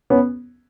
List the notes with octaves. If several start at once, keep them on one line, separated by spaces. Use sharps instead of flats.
B3 C#4